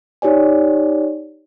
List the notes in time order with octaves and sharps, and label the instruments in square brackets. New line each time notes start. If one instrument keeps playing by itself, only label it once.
[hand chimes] D#4 G4 C#5 D5 G#5